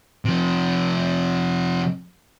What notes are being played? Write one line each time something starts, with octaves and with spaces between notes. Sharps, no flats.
C3 F3